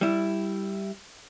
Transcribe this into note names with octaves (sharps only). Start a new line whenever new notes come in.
G3 E4